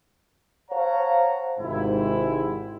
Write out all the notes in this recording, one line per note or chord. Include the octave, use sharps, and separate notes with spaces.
C5 C#5 F5 F#5 A5 A#5
G#1 G#2 C3 C4 E4